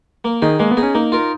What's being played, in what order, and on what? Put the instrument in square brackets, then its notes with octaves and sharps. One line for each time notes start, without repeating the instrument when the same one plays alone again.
[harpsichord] A#3
[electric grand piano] D#3 [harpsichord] D#4 G#4 D#5
[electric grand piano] G#3 [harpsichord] A#3
[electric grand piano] B3
[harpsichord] D#4 G#4 D#5
[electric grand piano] C#4
[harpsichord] A#3 [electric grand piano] D#4
[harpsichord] F4 A#4